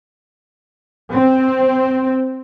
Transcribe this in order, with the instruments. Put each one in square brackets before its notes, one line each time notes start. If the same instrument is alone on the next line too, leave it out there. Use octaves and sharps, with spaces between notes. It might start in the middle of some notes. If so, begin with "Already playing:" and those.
[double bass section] C4